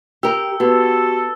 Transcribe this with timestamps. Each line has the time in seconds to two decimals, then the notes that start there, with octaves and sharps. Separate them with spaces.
0.23 G4 A#4 G5 E6
0.60 B3 F#4 G4 A4